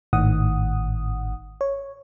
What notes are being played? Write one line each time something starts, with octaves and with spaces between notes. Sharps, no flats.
G#1 A2 D#3 F#5 D#6
C#5